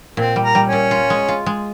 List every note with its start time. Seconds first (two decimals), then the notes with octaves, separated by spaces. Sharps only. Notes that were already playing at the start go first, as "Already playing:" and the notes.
0.17 A#2 C4
0.36 G3
0.43 A#4
0.55 G3
0.67 C#4
0.73 A#2
0.91 F4
1.10 G#3
1.28 F4
1.46 G#3